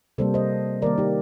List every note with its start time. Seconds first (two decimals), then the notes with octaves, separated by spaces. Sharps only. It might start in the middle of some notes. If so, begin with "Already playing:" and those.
0.18 C3 G3 A#3 A4 C5
0.34 C5 D#5
0.82 D#3 G3 A#3 A#4 D5
0.98 D#4 G4